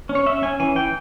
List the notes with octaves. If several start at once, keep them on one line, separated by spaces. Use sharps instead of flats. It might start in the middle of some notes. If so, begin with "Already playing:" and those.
C#4
C#5
C#4 E5
C#4 G#5
E3 G#5
E3 G5